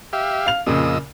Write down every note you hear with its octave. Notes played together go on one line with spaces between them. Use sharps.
G4 E5 F5
F5 F7
F2 A#2 C#3 D#5 E6